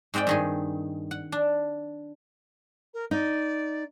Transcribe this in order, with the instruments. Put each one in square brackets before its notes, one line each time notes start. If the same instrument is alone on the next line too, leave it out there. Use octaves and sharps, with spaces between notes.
[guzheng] G#2 G#3 C4 D5 G5
G2 D#3 G#4
F#5
D4
[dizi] A#4
[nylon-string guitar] D#4 [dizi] D5